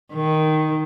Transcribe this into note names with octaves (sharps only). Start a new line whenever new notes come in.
D#3